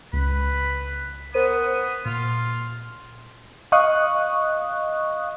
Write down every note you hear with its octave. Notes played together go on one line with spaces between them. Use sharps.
C#2 B4
B3 A#4 C5 D#7
A#2 F4
D#5 F5 C#6 D#6 F#6